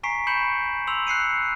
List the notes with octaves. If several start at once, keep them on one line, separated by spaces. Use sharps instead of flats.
G#5 A#5 C#6 B6 C7 D7
B5 C#6 G6 C#7 E7 F#7
C6 E6 F7
F#6 C7 C#7 D#7